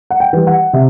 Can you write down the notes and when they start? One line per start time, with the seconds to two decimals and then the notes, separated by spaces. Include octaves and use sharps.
0.11 F#5
0.20 G5
0.33 E3 G3
0.47 F#5
0.73 C3 E5